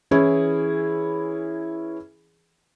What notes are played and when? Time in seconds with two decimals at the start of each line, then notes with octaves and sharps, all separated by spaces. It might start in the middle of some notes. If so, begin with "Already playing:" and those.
0.11 E3 C#4 E4 G#4